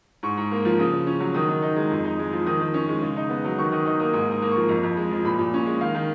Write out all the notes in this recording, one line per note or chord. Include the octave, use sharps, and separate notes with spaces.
G#2 C#6
G#2
A#3
F3
C#3 D#6
C#3
C#4
F#3
D#3 D#6
D#3
D#4
G#3
F2
D#4
G#3
F3
D#3 D#6
D#3
C#4
G#3
C#3
D#4
B3
F#3
D#3 C#6
D#3 D#6
D#4 D#6
A#3 D#6
G#2 D#6
G#2 D#6
A#3
F3 C#6
F2
F2
G#3
F3
A#2 B5
A#2
C#4
G#3
D#3 F5
D#3